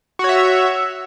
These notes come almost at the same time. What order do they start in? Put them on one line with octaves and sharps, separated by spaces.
F#4 C#5 E5